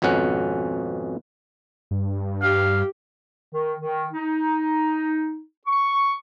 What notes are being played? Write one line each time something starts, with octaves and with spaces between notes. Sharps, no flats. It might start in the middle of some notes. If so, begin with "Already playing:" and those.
G#1 F2 B2 C#4 F#5
G2
G4 F5
D#3
D#3
D#4
C#6